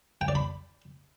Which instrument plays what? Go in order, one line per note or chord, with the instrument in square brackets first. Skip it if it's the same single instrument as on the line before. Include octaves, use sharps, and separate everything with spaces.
[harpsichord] G5
D5
B5